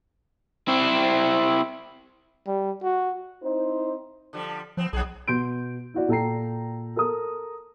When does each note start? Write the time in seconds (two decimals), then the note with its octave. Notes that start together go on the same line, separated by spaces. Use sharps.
0.68 C4 E4
2.47 G3
2.83 F#4
3.43 C4 D#4 E4 C5
4.33 D3 F3 G3
4.77 F3 B3 C4
4.93 B1 A#2 E3 G#4
5.28 B2 C6 G6 D7
5.94 E4 F#4 D5
6.09 A#2 A4 G5 A#5 C7
6.96 A4 A#4 A#5 D#6